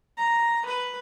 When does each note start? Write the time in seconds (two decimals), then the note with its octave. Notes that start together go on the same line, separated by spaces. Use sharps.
0.18 A#5
0.65 B4